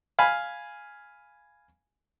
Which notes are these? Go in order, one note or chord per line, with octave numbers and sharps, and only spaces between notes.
F5 G#5 B5